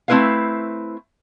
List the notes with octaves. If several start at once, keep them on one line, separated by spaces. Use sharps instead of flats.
A3 C4 E4 B4 E5 F5